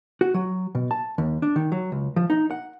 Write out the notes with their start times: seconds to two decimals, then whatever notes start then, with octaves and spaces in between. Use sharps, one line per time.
0.21 F#4
0.34 F#3
0.75 B2
0.91 A5
1.18 D#2
1.42 D4
1.56 D#3
1.72 F#3
1.92 C#2
2.16 F3
2.30 D#4
2.51 F#5